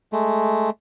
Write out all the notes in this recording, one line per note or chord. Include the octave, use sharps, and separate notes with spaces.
G#3 A3